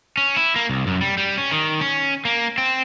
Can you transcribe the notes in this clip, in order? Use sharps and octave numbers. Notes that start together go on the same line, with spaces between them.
C#4
E4
A#3
C2
F#2
G3
G3
C#4
D#3
C#4
A#3
C4